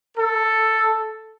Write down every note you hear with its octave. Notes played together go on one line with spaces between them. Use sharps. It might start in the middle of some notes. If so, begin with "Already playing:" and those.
A4